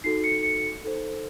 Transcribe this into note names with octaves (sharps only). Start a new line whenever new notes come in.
D#4 F#4 A4 C7
C#7
C#7
D#4 A4 C5